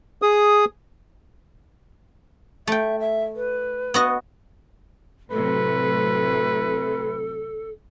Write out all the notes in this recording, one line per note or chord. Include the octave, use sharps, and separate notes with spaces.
G#4 D#6
A3 E5 G5
E5
B4
B3 F#4 D#5
A2 C3 F#3 A4 B4